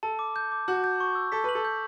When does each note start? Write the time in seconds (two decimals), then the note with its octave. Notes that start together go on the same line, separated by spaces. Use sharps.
0.03 A4 A5
0.19 D6
0.36 G6
0.52 D6
0.68 F#4 G6
0.84 G6
1.00 C#6
1.15 E6
1.32 A4 B6
1.44 B4 F#7
1.55 A4
1.65 G6